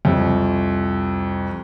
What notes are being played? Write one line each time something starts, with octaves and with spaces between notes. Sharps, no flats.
C2 F2